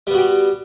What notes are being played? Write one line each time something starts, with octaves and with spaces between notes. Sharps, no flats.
G3 B3 F#4 G4